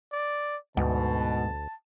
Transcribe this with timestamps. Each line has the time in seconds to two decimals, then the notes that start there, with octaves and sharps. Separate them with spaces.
0.13 D5
0.77 D2 G#2 B2 A5